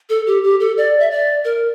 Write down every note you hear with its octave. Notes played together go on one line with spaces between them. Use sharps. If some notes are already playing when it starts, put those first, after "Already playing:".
A4
G4
G4
A4
D5
E5
D5
A#4